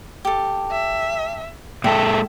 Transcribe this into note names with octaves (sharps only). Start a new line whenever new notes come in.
G4 A4
E5
A#2 G#3 A4 E5 G5